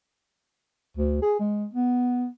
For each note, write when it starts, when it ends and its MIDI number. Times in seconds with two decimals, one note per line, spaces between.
0.97 1.17 38
1.22 1.36 68
1.40 1.65 56
1.73 2.27 59